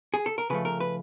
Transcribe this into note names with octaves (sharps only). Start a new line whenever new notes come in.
G#4
A4
A#4
C#3 F3 A3 B4
A#4
B4